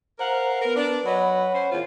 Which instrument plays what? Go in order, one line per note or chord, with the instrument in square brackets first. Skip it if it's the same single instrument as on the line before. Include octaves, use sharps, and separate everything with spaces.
[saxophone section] A#4 F5 F#5 [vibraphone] C5 A#5
[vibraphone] B3 B4 [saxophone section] A#4
[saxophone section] D4
[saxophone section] F#3 B4 D#5 [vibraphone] C#5 F#5 B5
[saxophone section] C#4 C5
E2 A#2 F4